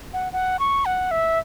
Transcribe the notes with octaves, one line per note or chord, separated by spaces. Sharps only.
F#5
F#5
C#6
F#5
E5